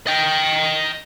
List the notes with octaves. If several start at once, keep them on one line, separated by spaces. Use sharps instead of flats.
D#5 G5